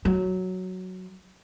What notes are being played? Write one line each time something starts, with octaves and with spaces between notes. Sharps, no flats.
F#3